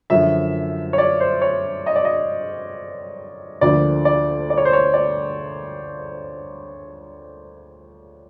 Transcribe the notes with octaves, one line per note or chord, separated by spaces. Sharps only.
F#2 D3 F3 E5
C#5
D5
C5
C#5
D#5
D5
D#5
D2 D3 F3 A#3 D5
D5
D5
C#5
C5
C#5
D5